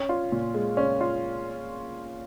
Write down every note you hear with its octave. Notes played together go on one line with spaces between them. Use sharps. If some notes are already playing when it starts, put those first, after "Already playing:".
Already playing: C#4
F4
A#2
G#3
C#4
F4